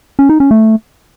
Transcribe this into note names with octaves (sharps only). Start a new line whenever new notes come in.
C#4
D#4
C#4
A3